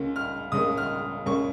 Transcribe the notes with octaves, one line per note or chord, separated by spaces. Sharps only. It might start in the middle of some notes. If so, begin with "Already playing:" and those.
Already playing: C#2 C#3 A#3
F6
C#2 C#3 A#3 D#6
F6
C#2 C#3 A#3 C#6